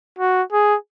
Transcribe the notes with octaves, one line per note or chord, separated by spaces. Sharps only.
F#4
G#4